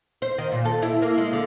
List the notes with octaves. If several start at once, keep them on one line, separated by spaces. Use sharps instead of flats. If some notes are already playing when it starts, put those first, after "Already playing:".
C5
D#3
A#2
A4
E4
A#3
G#3
D3